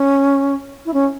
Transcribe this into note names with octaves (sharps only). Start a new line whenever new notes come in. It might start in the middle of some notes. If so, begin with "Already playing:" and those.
Already playing: C#4
E4
C#4